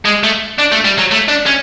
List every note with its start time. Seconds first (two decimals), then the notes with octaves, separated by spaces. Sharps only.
0.05 G#3
0.23 A3
0.58 D4
0.72 A3
0.84 G3
0.99 F#3
1.12 A3
1.29 D4
1.46 C#4